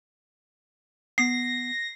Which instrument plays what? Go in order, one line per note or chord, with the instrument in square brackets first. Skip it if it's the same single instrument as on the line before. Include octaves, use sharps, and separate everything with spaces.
[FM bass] B3 [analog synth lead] A#6 [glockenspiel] C7